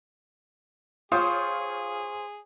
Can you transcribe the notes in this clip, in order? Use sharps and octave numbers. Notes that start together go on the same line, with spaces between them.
F4 G#4 C5 C#5 F5 G5 D#6